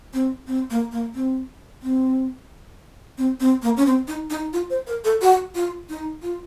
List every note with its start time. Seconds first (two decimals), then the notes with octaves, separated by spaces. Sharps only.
0.14 C4
0.47 C4
0.70 A#3
0.92 A#3
1.15 C4
1.82 C4
3.18 C4
3.40 C4
3.63 A#3
3.77 C#4
3.86 C4
4.08 D#4
4.30 D#4
4.53 F4
4.70 C5
4.87 A#4
5.04 A4
5.22 F#4
5.55 F4
5.89 D#4
6.23 F4